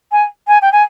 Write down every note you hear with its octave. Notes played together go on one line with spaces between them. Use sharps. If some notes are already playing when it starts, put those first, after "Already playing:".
G#5
G#5
G5
G#5